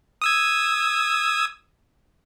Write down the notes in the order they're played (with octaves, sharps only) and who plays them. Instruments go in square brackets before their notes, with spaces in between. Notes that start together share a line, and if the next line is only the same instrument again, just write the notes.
[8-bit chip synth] D#6 E6 G#6